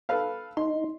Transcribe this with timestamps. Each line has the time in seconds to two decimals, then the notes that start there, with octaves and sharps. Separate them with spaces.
0.09 A4 B4 F5
0.57 D#4 C6